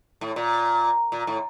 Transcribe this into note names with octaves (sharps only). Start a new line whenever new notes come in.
A2
A#2
A#2
A2